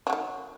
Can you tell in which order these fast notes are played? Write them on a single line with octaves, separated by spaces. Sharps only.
F#3 D3 D#3